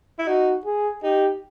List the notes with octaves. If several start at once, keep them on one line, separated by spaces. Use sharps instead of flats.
E4
D#4 F#4
G#4
D#4 G4